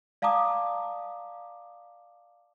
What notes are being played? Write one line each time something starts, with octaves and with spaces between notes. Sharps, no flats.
D5 F5 A5 A#5 D6 D#6